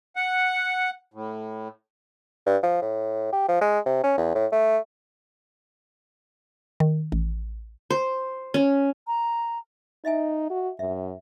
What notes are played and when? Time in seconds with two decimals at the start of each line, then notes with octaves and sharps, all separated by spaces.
0.16 F#5
1.14 A2
2.46 G2
2.63 F3
2.82 A2
3.32 G4
3.48 F3
3.61 G#3
3.86 C3
4.04 C#4
4.18 E2
4.35 A2
4.52 A3
6.80 D#3
7.12 A1
7.90 C5
8.54 C#4
9.07 A#5
10.05 D#4 D#5 E5 G#5
10.50 F#4
10.79 F#2 E5